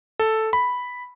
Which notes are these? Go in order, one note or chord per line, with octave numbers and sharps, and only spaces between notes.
A4
B5